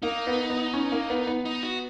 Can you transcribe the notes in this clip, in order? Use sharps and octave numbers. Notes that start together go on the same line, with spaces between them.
A#3 D#4
B3
B3
C#4
A#3
B3
B3
D#4
F#4